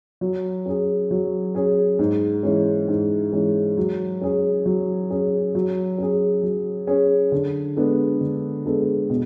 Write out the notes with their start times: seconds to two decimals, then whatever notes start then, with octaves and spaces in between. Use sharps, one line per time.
0.21 F#3
0.66 C#4 G#4
1.11 F#3
1.55 C#4 G#4
1.99 G#2
2.43 E3 G#3 C#4
2.88 G#2
3.32 E3 G#3 C#4
3.77 F#3
4.21 C#4 G#4
4.66 F#3
5.10 C#4 G#4
5.55 F#3
5.98 C#4 G#4
6.43 F#3
6.87 C#4 G#4
7.32 D3
7.76 G#3 B3 D4 A4
8.21 D3
8.65 G#3 B3 D4 A4
9.10 B2